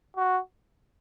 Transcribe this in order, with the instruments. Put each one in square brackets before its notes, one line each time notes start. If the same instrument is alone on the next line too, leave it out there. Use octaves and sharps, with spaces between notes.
[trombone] F#4